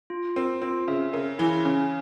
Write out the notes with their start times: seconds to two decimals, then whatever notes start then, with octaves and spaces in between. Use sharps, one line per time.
0.10 F4
0.36 C4 A#4
0.62 C4 F4
0.88 C#3 E5
1.13 C#3 A#4
1.39 E3 E4
1.65 C#3 C#4